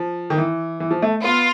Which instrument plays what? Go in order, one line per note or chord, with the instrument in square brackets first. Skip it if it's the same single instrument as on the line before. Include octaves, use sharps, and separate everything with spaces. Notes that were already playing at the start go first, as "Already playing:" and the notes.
Already playing: [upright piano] F3
D#3
E3
E3
F3
A3
[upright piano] B3 [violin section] F4